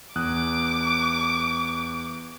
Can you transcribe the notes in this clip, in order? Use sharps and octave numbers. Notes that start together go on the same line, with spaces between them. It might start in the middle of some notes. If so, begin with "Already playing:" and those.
E2 D6 D#6 F#6